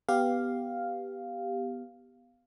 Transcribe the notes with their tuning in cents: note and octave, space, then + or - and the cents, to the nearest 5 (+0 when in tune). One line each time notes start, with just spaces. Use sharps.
B3 +0 G4 +0 F5 +0